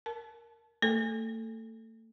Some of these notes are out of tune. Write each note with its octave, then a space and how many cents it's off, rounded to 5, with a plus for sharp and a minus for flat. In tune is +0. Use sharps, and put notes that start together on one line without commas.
A#4 +0 A5 -20
A3 +35 A4 +0 G5 +0